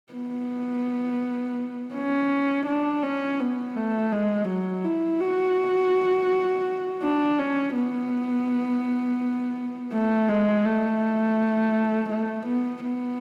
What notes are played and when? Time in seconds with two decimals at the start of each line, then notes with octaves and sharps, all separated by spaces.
0.13 B3
1.94 C#4
2.67 D4
3.03 C#4
3.40 B3
3.76 A3
4.12 G#3
4.49 F#3
4.84 E4
5.21 F#4
7.03 D4
7.38 C#4
7.75 B3
9.93 A3
10.29 G#3
10.65 A3
12.10 A3
12.47 B3
12.84 B3